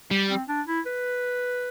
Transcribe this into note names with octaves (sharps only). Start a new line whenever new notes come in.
G3
C4
D4
E4
B4